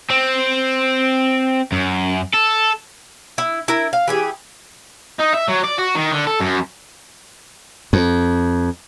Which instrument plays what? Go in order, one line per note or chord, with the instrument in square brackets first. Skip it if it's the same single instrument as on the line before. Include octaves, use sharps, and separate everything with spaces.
[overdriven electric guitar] C4
F#2
A4
[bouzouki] E4
E4 A#4
F5
E3 G4 G#4
[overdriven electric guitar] D#4
E5
F#3
D5
F#4
D#3
D3
A4
F#2
[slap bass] F2